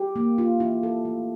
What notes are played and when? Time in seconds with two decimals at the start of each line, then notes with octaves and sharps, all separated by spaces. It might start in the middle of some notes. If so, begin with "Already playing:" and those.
Already playing: G4
0.16 A#3
0.38 F4
0.60 E4
0.83 A4
1.05 A3